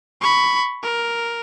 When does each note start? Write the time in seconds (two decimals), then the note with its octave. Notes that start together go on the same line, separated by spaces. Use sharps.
0.21 B5 C#6
0.83 A#4